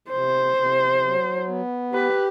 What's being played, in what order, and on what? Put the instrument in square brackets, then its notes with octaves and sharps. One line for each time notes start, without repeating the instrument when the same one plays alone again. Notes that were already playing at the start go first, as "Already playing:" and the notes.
[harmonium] C3 [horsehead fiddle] C5
[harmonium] C3
F#3
B3
[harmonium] G4 [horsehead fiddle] B4